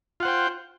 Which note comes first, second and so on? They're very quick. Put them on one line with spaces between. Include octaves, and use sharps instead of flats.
F4 F#5 C5 G5